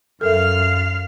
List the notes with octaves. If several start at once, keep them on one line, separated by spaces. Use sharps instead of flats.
F#2 A4 A#4 E5 F5 F6